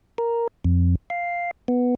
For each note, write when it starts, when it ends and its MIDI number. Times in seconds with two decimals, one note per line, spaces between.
0.18 0.48 70
0.64 0.95 41
1.10 1.51 77
1.68 1.95 59